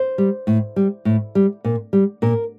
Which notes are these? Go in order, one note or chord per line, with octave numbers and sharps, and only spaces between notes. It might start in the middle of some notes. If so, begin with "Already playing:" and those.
Already playing: C5
G3
A2
G3
A2
G3
A#2
G3
A#2 A#4